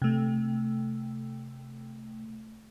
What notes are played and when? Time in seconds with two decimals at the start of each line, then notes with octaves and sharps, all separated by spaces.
0.02 C3 A3